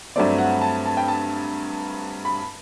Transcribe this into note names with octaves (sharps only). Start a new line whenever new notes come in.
G2 F#3 A3 C4 D5
F#5
A5
A5
G5
A5
B5